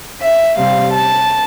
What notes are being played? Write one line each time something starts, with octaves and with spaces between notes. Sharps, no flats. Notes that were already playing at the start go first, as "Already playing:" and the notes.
E5
C3 G3 C4 F5
A5